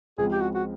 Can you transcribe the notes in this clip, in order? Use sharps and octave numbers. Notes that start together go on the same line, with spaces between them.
C#2 C#3 F3 G#3 C4 G#4
G4
F#4
F#4